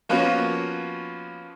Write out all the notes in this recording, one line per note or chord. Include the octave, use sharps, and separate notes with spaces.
F3 A#3 B3 C#4 F4 F#4